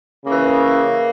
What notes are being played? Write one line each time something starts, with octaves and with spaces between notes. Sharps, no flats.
C#3 E3 A#3